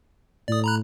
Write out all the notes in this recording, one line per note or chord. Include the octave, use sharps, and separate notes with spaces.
A2 D5 D#6
A#5 B5 F#6